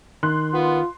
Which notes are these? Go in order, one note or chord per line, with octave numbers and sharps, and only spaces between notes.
D#3 C6 F#6
B3 F4